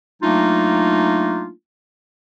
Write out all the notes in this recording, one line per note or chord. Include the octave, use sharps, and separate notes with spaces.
F#3 A3 A#3 D4 D#4 F4